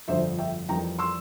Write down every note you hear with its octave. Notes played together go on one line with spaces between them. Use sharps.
G1 F2 D3 F3 C5 E5
E5 G5
F2 E3 G3 A#3 G5 A#5
C6 E6